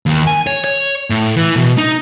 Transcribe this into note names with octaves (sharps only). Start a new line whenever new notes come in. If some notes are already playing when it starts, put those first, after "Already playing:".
D#2
G#5
C#5
C#5
A2
E3
B2
D#4